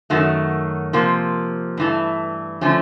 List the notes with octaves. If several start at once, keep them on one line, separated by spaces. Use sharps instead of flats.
F#2 D#3 F#3 A3
C3 F3 A#3
G2 E3 A3
D3 F3 A3 C#4